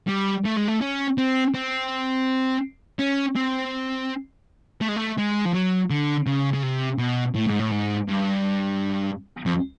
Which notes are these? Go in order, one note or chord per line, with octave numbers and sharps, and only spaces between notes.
G3
A3
G#3
A3
C#4
C4
C4
C#4
C4
A3
G#3
A3
G#3
F3
F#3
D3
C#3
C#3
C3
B2
A2
G#2
A2
G#2
G2
F2